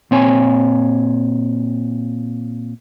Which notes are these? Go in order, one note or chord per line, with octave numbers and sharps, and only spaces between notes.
A#2 C4 C#5 G#5